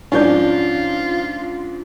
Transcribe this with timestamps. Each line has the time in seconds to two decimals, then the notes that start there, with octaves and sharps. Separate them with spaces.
0.12 G#2 F3 C#4 D4 F4 G6